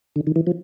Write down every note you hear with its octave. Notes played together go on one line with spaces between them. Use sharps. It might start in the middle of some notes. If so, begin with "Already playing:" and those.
D3
D#3
E3
F3